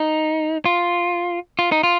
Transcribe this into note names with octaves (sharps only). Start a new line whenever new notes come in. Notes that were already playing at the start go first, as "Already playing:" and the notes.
Already playing: D#4
F4
F4
D#4
F4